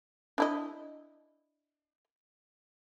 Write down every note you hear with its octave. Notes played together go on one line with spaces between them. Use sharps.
D4 E4 D#5